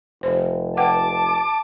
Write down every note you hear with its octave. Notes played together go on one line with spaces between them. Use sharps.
F1 C5
B4 F#5 G5 A5 D6